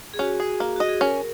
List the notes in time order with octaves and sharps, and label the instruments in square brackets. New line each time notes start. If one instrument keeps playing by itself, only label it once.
[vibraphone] G#4
[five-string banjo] C#4 [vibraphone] F#4
[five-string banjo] G#4
A#3
[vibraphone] F#4 [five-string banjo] D#5
[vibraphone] G#4
[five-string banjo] C#4 [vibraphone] A#4